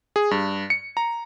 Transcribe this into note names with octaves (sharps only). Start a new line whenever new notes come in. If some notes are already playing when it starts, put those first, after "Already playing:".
G#4
G2
C#7
A#5